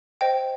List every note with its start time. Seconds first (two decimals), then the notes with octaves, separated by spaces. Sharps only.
0.21 C5 D#5 G5